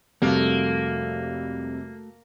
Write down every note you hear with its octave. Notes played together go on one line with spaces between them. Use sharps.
F2 C3 G3 A3 A#3 F#4 A4